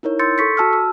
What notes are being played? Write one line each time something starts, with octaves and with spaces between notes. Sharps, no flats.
D#4 E4 A#4 C#5
C6 E6 G6 A6 C#7
A4 C#6 B6 C#7
F#4 A5 E6 F6
E6